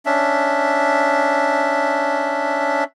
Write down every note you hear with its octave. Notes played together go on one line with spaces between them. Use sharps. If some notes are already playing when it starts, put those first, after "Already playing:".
C#4 D4 E5